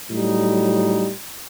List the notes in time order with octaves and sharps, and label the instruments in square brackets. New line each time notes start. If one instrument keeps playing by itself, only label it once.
[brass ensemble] A2 F#3 G3 D#4